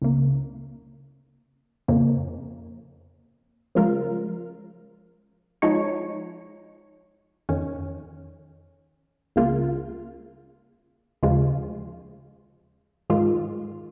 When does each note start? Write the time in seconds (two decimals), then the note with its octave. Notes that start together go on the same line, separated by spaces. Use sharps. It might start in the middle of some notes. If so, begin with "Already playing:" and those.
0.02 C#2 C#3 A#3
1.88 F2 C#3 A#3
3.75 C#3 F3 G#3 F4 A#4
5.62 F3 G#3 D#4 C#5
7.49 F2 D#3 C#4
9.36 C#2 C#3 A#3 F4
11.23 D#2 C#3 F3 G#3 F4
13.10 G#2 D#3 G#3 F4